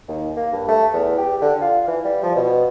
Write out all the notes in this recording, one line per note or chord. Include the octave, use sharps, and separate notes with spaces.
D#2
A#3
G2
A3
E2
G4
D3
F4
E3
G3
F3
B2